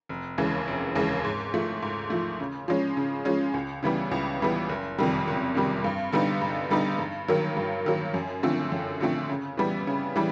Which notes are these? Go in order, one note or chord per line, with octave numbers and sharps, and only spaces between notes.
F1
D#2 C#3 E3 G#3
F1
D#2 C#3 E3 G#3
G#2
F3 A3
G#2
F3 A3
C#3
F3 G#3 C#4
C#3
F3 G#3 C#4
C#2
C#3 E3 G3 B3
C#2
C#3 E3 G3 B3
F#1
F2 C3 D#3 G3
F#1
F2 C3 D#3 G3
G2
D3 G3 B3 D#4
G2
D3 G3 B3 D#4
G2
D#3 F#3 A#3
G2
D#3 F#3 A#3
F#2
D3 F3 A3 C4
F#2
D3 F3 A3 C4
C#3
E3 G3 B3
C#3
E3 G3